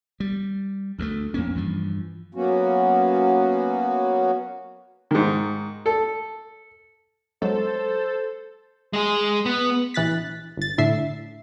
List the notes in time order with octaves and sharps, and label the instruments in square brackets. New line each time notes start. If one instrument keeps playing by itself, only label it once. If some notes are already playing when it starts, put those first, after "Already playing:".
[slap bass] G3
D2 G3 A3
F2 A#3 C#4
G2 E3 F3
[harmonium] F#3 A#3 B3 C#4 F#4
[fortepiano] G#2 D#3
A4
[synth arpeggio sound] F#3 G#3 [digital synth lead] A4 [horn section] C5
[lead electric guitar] G#3 G#4
B3
[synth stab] A#1 E3 F#6 A6 B6
G1 A6
A2 D3 E5 C7